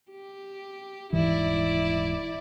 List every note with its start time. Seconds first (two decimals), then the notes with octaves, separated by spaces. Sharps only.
0.11 G4
1.13 D#1 G#2 E3 E4 D5